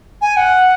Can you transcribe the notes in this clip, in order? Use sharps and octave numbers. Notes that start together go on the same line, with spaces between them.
G#5
F#5